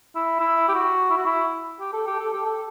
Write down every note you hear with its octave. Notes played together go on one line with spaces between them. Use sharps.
E4
E4
G4
F#4
E4
F#4
E4
G4
A4
G4
A4
G4
A4